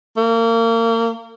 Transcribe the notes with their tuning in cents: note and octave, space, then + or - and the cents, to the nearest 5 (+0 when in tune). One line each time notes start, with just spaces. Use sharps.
A#3 -30